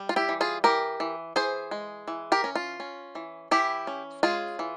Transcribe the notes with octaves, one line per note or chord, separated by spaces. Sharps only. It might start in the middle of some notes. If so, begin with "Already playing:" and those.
Already playing: G3
F4
E4 G4
E3
F4 G#4
E3 G4 A#4
E3
E3 G#4 C5
G#3
E3
G4 A#4
C#4
F4
C#4
E3
E3 E4 G4
C#4
G#3 F4 G#4
E3